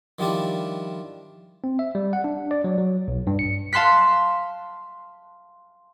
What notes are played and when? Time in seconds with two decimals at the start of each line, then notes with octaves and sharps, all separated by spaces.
0.19 D#3 F3 G3 D4 E4
1.64 C4
1.79 E5
1.95 G3
2.13 F#5
2.24 D4
2.51 D5
2.64 F#3
2.78 F#3
3.08 B1
3.27 G2
3.39 C#7
3.73 F5 A5 C6 F#6 B6